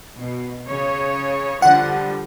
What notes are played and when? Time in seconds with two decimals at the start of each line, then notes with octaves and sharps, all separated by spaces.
0.18 B2
0.68 C#3 C#5
1.62 D3 F3 G3 F#5